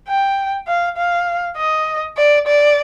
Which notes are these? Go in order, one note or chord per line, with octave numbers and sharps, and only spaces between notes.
G5
F5
F5
D#5
D5
D5